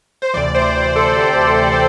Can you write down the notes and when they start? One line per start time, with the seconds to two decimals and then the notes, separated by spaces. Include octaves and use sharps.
0.22 C5
0.34 D2 C3 E3 D5
0.55 C5
0.96 A4
1.17 G4
1.72 A4